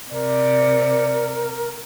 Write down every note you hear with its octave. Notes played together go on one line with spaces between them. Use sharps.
C3 A#4 D5